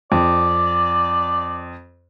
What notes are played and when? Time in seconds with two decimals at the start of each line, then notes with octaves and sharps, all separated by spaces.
0.12 F2 D5